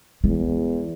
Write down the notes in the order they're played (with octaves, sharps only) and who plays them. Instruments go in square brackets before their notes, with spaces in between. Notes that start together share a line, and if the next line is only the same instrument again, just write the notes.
[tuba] E2 [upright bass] G#3